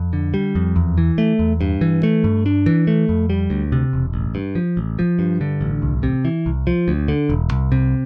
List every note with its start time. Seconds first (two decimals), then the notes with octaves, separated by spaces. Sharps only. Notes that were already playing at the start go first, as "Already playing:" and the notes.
Already playing: F2
0.13 D3
0.34 G3
0.55 F2
0.76 E2
0.98 E3
1.18 A3
1.39 E2
1.61 G2
1.81 E3
2.03 A3
2.24 G2
2.46 D4
2.66 E3
2.87 A3
3.09 F2
3.30 G3
3.50 D2
3.72 C3
3.93 E1
4.14 A1
4.35 G2
4.55 F3
4.77 A1
4.99 F3
5.19 G2
5.41 D3
5.61 A1
5.82 C2
6.03 C3
6.25 E3
6.46 C2
6.67 F3
6.88 D2
7.08 D3
7.30 E1
7.51 C2
7.72 C3